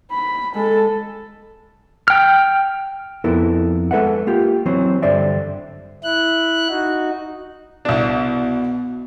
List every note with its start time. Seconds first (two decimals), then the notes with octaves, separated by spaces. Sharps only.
0.11 B5
0.55 G#3 A4
2.08 G5 F6
3.24 F2 B3 E4 A4 A#4
3.91 G#3 A4 B4 E5 F#5
4.27 A#3 F4 G4
4.66 E3 F#3 C4 C5
5.02 G2 D3 C5 D5 E5
6.04 E4 F#6
6.69 D#4 F#4
7.85 C2 B2 D4